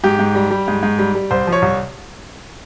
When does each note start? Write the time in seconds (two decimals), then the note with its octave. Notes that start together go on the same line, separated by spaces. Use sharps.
0.04 G#2 G4
0.19 G#2
0.35 G3
0.51 G3
0.68 G#2
0.83 G#2
0.99 G3
1.15 G3
1.31 C2 C5
1.47 F3
1.53 C#5
1.62 C2